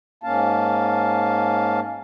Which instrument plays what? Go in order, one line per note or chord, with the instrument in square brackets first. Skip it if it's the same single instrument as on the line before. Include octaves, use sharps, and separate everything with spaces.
[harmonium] G#2 A#3 C#4 F5 A5